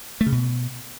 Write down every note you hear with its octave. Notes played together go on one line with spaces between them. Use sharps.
A3
C#3
B2